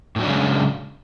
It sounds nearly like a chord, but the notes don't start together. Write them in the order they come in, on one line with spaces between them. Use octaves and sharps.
A2 F#3 D4 C#3 G#3